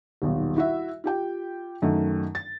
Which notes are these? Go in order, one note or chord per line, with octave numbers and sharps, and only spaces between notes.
D#1 B1
E4 F#4 E5
F4 G4 G5
F#2 D#3 A3
A6